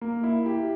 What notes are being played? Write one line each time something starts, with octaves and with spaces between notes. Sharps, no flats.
A#3
E4
G4